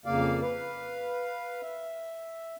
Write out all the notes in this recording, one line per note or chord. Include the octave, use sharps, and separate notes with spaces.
F2 C#3 A#3 D5 F5
B4 F5
E5